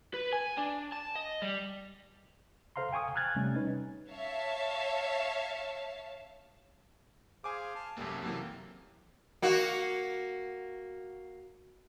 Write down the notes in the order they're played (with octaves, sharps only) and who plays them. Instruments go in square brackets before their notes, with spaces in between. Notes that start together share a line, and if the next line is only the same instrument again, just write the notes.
[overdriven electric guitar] B4
G#5
D4
A5
D#5
G3
[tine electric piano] A4 C5 F5 A#5 C6
F5 G5 G#5 C#6 D#6
G#5 A#5 F6 F#6 G#6 A6
C3 G3 A3 C#4
C#4 D#4 B4
[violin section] C#5 E5 F5 A5
[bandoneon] G#4 C5 F5 [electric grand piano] G#5 D6
[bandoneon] A5 F6
[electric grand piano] C2 F#2 [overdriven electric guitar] A#3 C#4 [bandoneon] G4 A4
[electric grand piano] C3 F#3 A#3 [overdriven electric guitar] E3
[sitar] A#3 F#4